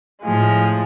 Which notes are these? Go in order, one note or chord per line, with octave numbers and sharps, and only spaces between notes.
A2 F3 G#3